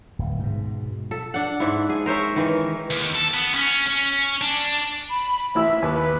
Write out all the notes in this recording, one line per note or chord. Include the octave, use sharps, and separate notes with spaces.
D1
G#2 B2
A4
D4 F#5
G#2 E4
G#4
A#4 C5 C#5 E5
D#3 E3
D#2
A4
B3
C#4
C#4
D4
B5
A1 E4 E5 E6
D#2 B4